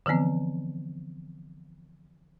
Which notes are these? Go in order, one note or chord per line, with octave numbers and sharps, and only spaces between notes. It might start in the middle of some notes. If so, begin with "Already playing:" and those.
D3 E3 F3 B3 C4